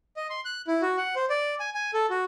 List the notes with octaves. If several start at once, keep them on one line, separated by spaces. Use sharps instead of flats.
D#5
C6
F#6
E4
F#4
F#5
C5
D5
G#5
G#5
A4
F#4